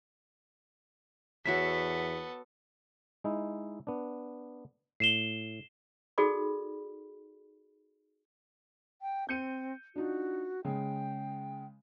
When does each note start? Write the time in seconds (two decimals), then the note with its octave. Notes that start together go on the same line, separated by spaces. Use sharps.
1.46 E2 B3 F#4 A4 C#5 E5 B6
3.24 G#3 D#4 E4
3.87 B3 D4
5.00 A2 C7 E7 G7
6.18 D#4 F#4 G#4 A4 D5 B5
9.02 G5
9.29 C4 G6 C#7 D#7
9.96 D4 D#4 F4 F#4
10.65 C#3 G#3 G5